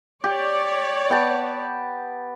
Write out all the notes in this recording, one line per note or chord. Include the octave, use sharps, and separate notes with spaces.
G4 C#5 D5
B3 G5 A5